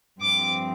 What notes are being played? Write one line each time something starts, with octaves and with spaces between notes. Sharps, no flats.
G2 F3 C4 D6